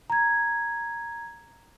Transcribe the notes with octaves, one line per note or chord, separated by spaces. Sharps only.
A#5 G#6